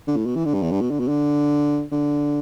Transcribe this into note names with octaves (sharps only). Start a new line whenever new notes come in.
D3
A2
B2
E3
D3
G2
E2
G2
B2
D3
B2
D3
D3